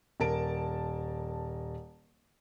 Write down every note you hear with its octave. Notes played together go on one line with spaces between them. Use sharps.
D#1 A#4 A5 D7